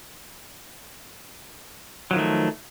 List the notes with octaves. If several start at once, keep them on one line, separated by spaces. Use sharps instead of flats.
D#3 F3 F#3 A3